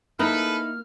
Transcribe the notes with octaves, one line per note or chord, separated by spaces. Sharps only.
A#3 D#4 E4 G#4 A4 B4 F6